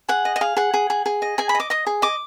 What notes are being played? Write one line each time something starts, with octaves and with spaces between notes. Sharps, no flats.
G#4 F#5
D#5
D#5
G#4 F5
G#4 F#5
G#4
G#4
G#4
D#5
G#4 G#5
B5
D#5 D6
D#5 D#6
G#4
D#5 D6